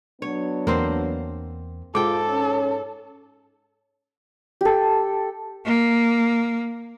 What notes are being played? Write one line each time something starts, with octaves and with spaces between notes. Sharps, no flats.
F#3 B3 D4 C#5
E2 A#3 C4 C5
G#2 F4 A4 G5 D6
C#4
G4 A4
A#3